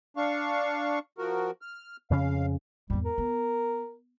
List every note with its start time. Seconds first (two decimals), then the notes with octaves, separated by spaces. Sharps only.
0.17 D4 F5 C#6
1.18 F3 F#4 A#4
1.62 F6
2.11 F2 C#3 C#4 F5
2.90 E2 G#2 G3
3.04 A#4
3.18 B3